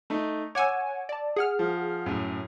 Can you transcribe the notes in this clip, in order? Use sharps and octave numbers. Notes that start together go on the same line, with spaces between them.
A3 D#4
C#5 F#5 G#5 D6 E6
D5 A5
G#4 F#5 F6
F3
F#2 A2